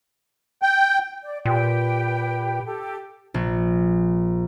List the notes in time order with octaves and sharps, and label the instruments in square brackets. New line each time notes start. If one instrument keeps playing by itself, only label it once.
[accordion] G5
[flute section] D5
[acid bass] A#2 [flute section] G4 B4 G5
[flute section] G4 A4
[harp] A#1